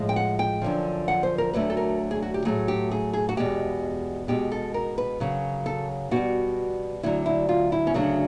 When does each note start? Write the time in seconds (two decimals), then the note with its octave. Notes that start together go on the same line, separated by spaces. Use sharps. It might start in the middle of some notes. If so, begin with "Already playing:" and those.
Already playing: A2 F3 G#3
0.09 G5
0.16 F#5
0.39 G5
0.62 F#2 D3 F3
1.08 F#5
1.23 C5
1.38 A#4
1.53 D2 D3 F#3 A3 B4
1.70 A4
1.77 A#4
2.11 G#4
2.22 F#4
2.34 G4
2.45 A2 F#3 A3 G#4
2.68 G4
2.91 G#4
3.13 G#4
3.29 F#4
3.37 E2 B2 G#3 G4
4.28 B2 G#3 G4
4.52 A4
4.74 A#4
4.98 B4
5.20 F#2 C#3 F#3
5.66 A4
6.11 B2 G3 F#4
7.03 D2 D3 F#3 E4
7.26 E4
7.49 F4
7.72 E4
7.87 C#4
7.94 D2 C#3 F#3 A3 D4